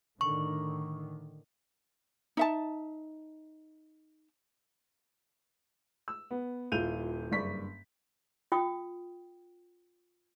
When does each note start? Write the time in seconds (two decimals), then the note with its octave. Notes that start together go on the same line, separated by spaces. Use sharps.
0.21 A2 D3 D#3 C#6
2.37 D#4 E5 A5
6.08 E6
6.31 B3
6.72 D#1 E4 F4 G6 D#7 F7
7.31 F#1 G2 D5 C#6 B6
8.52 F4 G5 D#6